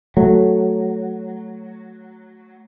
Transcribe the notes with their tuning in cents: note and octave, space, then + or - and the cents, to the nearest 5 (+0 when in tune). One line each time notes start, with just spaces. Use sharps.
F#3 +0 A3 +0